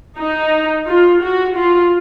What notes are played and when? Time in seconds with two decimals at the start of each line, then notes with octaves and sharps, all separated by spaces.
0.19 D#4
0.88 F4
1.23 F#4
1.56 F4